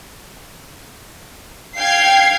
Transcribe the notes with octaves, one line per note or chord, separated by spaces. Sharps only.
F5 G5 G#6 C7